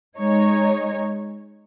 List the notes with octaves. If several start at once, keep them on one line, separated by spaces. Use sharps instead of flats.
G#3 D#4 C#5